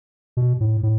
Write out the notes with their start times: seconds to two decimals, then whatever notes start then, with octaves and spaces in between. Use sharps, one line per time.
0.37 B2
0.60 A2
0.83 A2